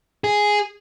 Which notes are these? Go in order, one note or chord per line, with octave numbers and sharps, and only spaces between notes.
G#4